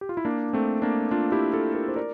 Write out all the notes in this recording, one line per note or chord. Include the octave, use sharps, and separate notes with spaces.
G4
F4
E4
A#3 D4
A3 C4
A#3 D4
D4 F4
E4 G4
F4 A4
G4 A#4
C5
A#4 D5